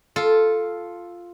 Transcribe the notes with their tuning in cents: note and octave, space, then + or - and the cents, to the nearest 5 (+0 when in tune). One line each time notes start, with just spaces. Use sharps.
F4 +0 A4 -5